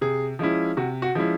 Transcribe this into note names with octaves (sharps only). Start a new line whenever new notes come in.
C3 G#4
F3 G#3 C#4 E4
C3 F#4
F#4
F3 G#3 C#4 E4